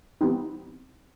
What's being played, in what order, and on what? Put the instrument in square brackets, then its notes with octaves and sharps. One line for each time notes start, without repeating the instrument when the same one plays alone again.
[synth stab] E3 G3 B3 C4 D#4